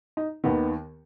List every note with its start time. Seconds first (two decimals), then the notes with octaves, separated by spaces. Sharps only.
0.17 D#4
0.44 D#2 D#3 B3